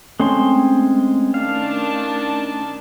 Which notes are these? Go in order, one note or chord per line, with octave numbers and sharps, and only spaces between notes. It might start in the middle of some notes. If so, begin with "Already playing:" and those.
G#3 A3 C4 C#4 C6
D#3 D4 F5 A5